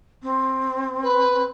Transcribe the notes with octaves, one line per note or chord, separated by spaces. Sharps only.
C4
B4